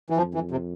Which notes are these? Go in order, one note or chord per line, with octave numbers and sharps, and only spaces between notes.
E3
F2 F3
E3
C3